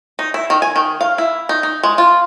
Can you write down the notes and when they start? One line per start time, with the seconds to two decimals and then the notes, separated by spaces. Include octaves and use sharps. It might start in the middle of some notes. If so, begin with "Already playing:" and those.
0.19 D#4
0.34 E4
0.50 D#3
0.62 G#5
0.76 D#3
1.01 F5
1.18 E4
1.49 D#4
1.63 D#4
1.83 G#3
1.98 F4